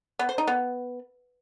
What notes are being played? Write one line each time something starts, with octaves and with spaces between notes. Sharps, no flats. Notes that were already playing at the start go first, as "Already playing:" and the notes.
B3
C5
D#4
B3